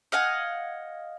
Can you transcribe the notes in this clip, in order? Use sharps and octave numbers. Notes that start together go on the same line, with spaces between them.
D#5 F5 F#5 G#5